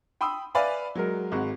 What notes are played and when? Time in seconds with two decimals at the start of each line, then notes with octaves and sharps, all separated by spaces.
0.21 G5 B5 C6 D#6 E6
0.55 B4 D5 E5 F5 G#5 B5
0.95 F#3 G#3 A#4
1.32 G#1 G#3 F#4